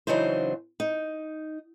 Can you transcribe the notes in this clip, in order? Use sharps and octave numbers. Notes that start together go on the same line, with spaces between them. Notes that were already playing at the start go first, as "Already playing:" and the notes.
C#3 E3 F#3 D4 D#4 C5
D#4